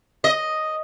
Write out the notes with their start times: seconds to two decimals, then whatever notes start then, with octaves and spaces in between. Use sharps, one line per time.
0.24 D#5